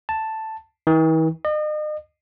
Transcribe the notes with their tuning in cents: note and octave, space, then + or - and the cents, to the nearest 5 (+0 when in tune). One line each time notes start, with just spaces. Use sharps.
A5 +5
E3 -45
D#5 -40